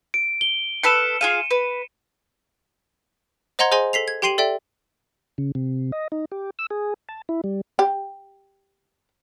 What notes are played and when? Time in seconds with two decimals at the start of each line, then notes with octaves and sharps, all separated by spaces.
0.14 D7
0.41 G7
0.83 A4 B4 F6 C#7 E7
1.21 F4 G#4 F5 D#7
1.51 B4
3.59 C5 D#5 F#5 A#5 C6 G#6
3.71 G#4 C5 D#5 G#5 C6
3.93 A4 B6 C7 F7
4.08 G#6
4.22 G4 G5 C6 C7 D#7 F#7
4.38 A4 D5 E5 G5
5.38 C#3
5.55 C3
5.92 D#5
6.12 D#4
6.32 G4
6.59 E6
6.71 G#4
7.09 A5
7.29 E4
7.44 G3
7.79 G4